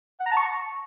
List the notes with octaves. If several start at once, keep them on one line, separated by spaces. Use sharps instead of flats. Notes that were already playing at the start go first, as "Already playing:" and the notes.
F#5
A#5
A5
C#6